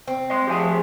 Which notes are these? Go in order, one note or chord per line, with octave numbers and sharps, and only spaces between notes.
C4
D#5 C6
F3 G4 G#4 E5 G#5